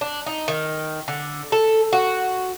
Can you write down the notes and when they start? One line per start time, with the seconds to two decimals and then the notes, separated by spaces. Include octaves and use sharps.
0.01 D4
0.26 D#4
0.48 D#3
1.08 D3
1.52 A4
1.93 F#4